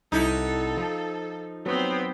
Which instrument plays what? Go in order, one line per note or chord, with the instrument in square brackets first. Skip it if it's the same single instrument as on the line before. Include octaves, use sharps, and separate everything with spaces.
[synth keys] C2 E4 F#5 [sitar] D#4 [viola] A4
[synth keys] F3
[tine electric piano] F#3 [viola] B3 C4